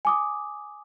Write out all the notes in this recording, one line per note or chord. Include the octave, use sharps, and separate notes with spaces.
G#5 D6 D#6